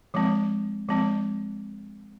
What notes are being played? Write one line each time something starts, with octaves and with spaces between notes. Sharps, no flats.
F3 G#3 C4
F3 G#3 C4